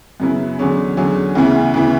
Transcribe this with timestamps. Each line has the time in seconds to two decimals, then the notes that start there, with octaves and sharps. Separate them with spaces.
0.20 F#2 C#3 F#3 B3 E4
0.58 E2 D3 F#3 C#4 G#4
0.97 E2 D3 F#3 C#4 G#4
1.35 D2 C#3 E3 B3 E4
1.74 D2 C#3 E3 B3 E4